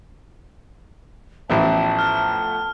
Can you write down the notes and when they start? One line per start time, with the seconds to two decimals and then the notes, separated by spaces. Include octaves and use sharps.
1.50 A1 F3 A3 B3 E4 A5
1.99 F6